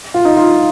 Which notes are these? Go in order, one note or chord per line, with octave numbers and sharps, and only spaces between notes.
F4
D#4
F4